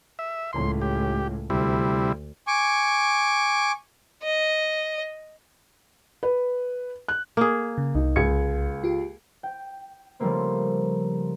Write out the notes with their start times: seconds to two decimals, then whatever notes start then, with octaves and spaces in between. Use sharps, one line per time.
0.19 E5
0.53 C#2 A2 C6
0.81 G4
1.50 D2 C3 G3 E4
2.47 G#5 C#6 D6
4.23 D#5
6.23 B4
7.08 F#6
7.37 A#3 G#4
7.78 C#3
7.95 C2 D#4
8.16 C#2 G#6 C#7
8.84 F4 G4
9.43 G5
10.20 C#3 F3 G3 A3 A#3 C4